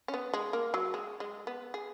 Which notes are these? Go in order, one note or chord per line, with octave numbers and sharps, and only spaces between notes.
C#4
B3
G#3
A#3
F#3
G#3
G#3
B3
G#4